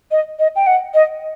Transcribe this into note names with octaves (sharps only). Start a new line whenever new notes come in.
D#5
D#5
G5
F#5
D#5